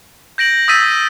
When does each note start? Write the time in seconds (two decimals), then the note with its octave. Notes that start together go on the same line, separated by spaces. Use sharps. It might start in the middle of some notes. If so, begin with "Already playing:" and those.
0.38 G6 A#6 D7 F#7
0.68 D#6 E6 G6 A6 B6 D#7